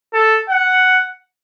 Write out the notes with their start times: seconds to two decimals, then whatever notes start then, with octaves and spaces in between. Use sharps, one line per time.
0.13 A4
0.50 F#5